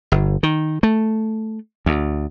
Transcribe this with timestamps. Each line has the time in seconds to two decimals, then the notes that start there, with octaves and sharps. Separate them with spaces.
0.12 G1
0.43 D#3
0.83 A3
1.86 D2